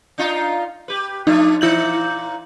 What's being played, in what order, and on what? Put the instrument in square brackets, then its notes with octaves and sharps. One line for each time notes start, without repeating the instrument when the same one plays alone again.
[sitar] D4 D#4 F4
G4 B4
[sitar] F3 A3 D4 [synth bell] D#4
[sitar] A#2 E3 [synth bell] E4 G6 F#7